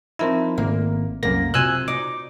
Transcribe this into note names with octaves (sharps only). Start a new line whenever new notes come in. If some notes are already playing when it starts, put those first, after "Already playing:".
F3 C4 D#4 E4 A#4 E5
G#1 A#3
C2 F#2 A#3 A#6
C3 F4 F#4 G#5 E6 F#6
D#4 D6